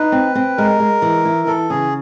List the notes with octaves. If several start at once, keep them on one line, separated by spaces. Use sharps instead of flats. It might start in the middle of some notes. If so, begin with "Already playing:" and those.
Already playing: D#4 B4
C4
C4
G#3 A#4
G#3
E3
E4
E3 A4
C#3 G#4